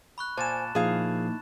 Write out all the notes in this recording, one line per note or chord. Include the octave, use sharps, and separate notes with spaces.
B5 C#6 F#6
A#2 C5 G#5 A5 A6 E7
A#2 F3 A#3 D#4 E4 G#4 F5